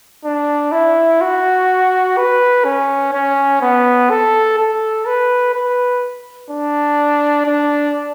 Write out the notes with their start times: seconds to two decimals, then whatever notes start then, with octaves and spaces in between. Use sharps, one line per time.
0.25 D4
0.72 E4
1.21 F#4
2.17 B4
2.64 C#4
3.13 C#4
3.61 B3
4.10 A4
4.58 A4
5.06 B4
5.54 B4
6.51 D4
7.46 D4